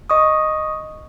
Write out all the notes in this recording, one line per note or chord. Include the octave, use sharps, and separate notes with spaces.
D#5 C#6 D#6